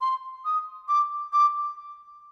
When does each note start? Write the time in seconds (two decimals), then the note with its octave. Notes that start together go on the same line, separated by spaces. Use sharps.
0.01 C6
0.45 D#6
0.88 D6
1.33 D6